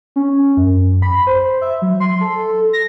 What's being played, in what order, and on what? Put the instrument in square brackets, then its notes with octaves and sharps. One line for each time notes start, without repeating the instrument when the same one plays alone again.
[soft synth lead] C#4
F#2
B5
C5
E5
F#3
C6
A4
A#6